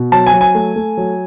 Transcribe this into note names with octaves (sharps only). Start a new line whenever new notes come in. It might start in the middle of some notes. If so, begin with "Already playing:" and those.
Already playing: B2
F#3 A5
G#5
F#3
G#5
A3
A3
F#3